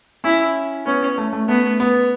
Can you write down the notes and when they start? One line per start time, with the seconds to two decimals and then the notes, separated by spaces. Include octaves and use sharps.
0.24 C#4 E4
0.86 B3 C#4
1.18 A3
1.33 A3
1.49 A3 B3
1.80 B3